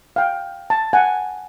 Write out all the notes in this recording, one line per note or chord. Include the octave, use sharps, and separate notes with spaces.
F5 G5
A5
F#5 G#5